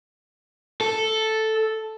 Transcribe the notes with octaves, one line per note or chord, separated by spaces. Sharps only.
A4